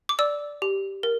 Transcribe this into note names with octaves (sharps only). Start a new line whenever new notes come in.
D6
D5 E6
G4
A#4